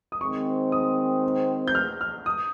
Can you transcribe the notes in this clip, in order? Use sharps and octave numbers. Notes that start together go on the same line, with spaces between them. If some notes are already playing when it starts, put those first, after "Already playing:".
D#6
D#3 G#3 C4 C#6
D#6
G6
F6
F6
D#6